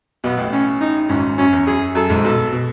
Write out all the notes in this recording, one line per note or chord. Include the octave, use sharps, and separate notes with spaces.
B1 B2 B3
A1 A2
C#4
D#4
G#1 G#2 C#4
F#2 C#4
E2
F#2 G#4
F#2 A4
G#1 G#2
B1 B2 A4
B2